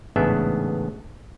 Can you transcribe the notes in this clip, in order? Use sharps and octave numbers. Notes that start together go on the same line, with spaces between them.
A1 G#2 C#3 B3 D4 E5